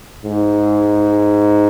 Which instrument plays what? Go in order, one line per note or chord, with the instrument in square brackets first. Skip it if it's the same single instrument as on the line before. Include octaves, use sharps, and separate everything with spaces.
[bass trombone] G#2